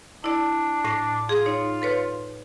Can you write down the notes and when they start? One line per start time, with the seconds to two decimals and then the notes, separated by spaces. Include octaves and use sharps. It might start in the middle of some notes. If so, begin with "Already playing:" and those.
0.24 D4 E4 D5
0.84 A2 A#6
1.29 F4 G#4
1.46 D#4 C#5
1.82 A4 B4 C#5